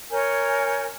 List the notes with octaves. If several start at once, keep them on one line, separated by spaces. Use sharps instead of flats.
A#4 C#5 G#5 G6